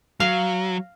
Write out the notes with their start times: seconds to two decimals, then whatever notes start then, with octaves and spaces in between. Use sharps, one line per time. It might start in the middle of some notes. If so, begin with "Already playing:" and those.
0.20 F#3 F5